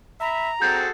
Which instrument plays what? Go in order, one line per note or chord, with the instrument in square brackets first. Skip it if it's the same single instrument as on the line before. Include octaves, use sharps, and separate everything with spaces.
[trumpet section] E5 B5 [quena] A#5
[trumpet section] C4 [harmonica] F#4 G#4 A4 [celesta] G6